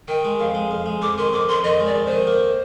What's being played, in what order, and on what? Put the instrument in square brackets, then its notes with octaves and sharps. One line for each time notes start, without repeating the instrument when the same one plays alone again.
[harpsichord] D#3 [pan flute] G5
[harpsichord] G#3
[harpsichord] F2 [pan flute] F5
[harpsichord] G#3
F2
G#3
[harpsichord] F2 [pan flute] D6
[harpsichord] D#3 [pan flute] C6
[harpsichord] F2 [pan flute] D6
[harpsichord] F2 [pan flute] C6
[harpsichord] D#3 [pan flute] D#5
[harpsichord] G#3
[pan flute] D5
[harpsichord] F2
[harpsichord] D#3 [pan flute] C5
[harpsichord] A#3